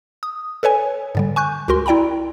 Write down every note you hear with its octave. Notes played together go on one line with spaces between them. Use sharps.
D#6
A4 B4 C#5 G#5
G#2 D3 G3
G#5 C#6 F#6 G6
C#2 F#4 A#4 C6
E4 D5 G5 A#5 B5